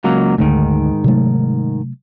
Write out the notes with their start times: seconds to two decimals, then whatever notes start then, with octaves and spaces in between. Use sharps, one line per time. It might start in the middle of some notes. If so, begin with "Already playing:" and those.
0.04 C#2 F#3 A#3
0.38 D2 G#2 D3 D#3 A3
1.04 C3 F#3 A3